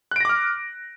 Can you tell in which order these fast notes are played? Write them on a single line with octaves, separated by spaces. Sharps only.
F#6 D7 A#6 D6 F6